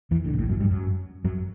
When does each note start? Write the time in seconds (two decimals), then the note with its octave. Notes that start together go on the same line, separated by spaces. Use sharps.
0.11 E2 E3
0.24 D2 D3
0.33 B2
0.39 A1 A2
0.49 F#2 F#3
0.60 G2 G3
0.71 F#2 F#3
1.24 F#2 F#3